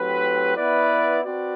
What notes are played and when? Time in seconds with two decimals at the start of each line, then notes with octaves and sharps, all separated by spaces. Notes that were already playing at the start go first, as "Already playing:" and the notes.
Already playing: A2 F#3 C4 G4 B4
0.55 B3 E4 B4 D5
1.22 C4 F#4 B4 D5